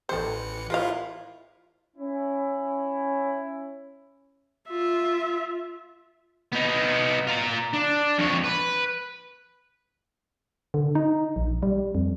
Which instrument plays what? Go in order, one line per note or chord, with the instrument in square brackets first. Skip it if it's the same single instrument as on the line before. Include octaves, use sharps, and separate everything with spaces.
[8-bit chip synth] A1 E3 C#7 [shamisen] A4 C5
[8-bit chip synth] E4 F4 [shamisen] A#4 C5 F5
[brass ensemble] C#4 E4
[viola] F4 E5
[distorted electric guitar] B3 D#4
F4 A#5
D4
F2 C#5
B4
[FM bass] D3
D#4
A#1
G3
F2